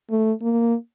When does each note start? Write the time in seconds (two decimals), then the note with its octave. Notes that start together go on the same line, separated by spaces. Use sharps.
0.10 A3
0.41 A#3